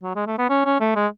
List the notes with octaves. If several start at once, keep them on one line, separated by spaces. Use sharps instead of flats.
F#3
G#3
A3
B3
C#4
C#4
A3
G#3